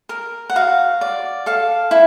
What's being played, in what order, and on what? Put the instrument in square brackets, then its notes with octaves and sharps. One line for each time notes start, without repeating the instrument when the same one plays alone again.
[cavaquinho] A#4
F#5
F#4 F5
D5
A4 F5
E4